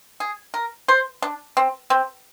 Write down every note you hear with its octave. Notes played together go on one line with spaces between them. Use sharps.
G#4
A#4
C5
D4
C4
C4